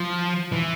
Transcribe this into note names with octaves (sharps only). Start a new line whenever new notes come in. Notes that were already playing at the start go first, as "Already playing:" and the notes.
Already playing: F3
E3